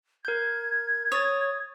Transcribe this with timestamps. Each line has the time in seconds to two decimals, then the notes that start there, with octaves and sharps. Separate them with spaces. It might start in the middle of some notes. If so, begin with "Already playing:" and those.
0.25 A#4 G6 G#6
1.12 C#5 D#6 A6